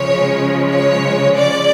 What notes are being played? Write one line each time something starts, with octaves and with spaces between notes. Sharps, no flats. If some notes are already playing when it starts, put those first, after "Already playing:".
Already playing: C#3 F3 G#3 C#5
C#5
D5